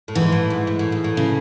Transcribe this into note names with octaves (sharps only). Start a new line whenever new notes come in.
A2
G#2 E3
A2
G#2
G#2
A2
G#2
A2
C#3